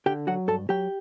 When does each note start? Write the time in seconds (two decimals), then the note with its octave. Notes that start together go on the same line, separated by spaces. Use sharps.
0.06 D3 G4 G5
0.27 F#3 F#4 F#5
0.48 G2 A4 A5
0.69 F#3 G4 G5